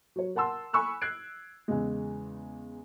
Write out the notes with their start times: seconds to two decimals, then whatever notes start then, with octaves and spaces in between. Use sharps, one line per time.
0.16 F#3 C#5
0.35 A#4 F#5 A5 C6 E6
0.73 G#5 B5 C#6 E6 F#6
1.01 F#6 G#6 C7 D7
1.68 E2 C#3 G#3